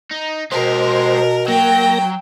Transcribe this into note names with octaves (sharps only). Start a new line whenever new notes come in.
D#4
B2 G#3 G4 A#4 C5
F#3 A#3 G5 A#6